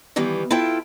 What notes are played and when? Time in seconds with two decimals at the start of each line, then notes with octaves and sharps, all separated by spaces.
0.16 D#3 E3 G3 B3
0.51 E4 F4 A4 G5